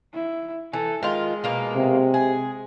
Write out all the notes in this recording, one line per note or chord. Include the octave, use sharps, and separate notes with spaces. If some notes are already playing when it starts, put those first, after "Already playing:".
E4
E3 A4
D#3 G#3 F4
B2 A#3 F4
C3
G#4